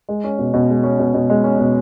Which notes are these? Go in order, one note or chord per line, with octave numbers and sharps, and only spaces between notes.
G#3
C#4
B2
B2
G#3
C#4
B2
B2
G#3
C#4
B2